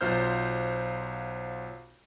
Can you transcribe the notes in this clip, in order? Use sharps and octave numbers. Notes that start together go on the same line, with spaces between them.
B1 F#3 F4 C5 F6 G6